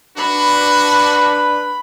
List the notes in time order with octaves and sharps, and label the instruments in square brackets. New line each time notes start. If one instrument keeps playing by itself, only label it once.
[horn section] D4 [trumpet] F#4 [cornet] B4 [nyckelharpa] B5